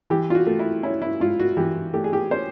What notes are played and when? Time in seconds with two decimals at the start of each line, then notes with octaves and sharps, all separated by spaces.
0.10 E3 G4
0.30 F4
0.35 F#4
0.47 A3
0.59 E4
0.83 C#4 E4
1.02 E4
1.20 G#2 F4
1.40 F#4
1.57 E3 G4
1.94 A3 G4
2.04 G#4
2.13 G4
2.31 C#4 C5